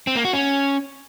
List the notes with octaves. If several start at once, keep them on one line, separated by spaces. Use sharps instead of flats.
C4
A#3
F#4
C#4